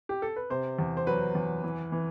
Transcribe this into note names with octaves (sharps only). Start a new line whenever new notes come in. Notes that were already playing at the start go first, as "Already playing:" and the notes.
G4
A4
B4
C3 C5
E2
C5
F#3 B4
E2
E3
E3